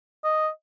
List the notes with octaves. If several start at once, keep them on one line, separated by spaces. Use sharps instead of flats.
D#5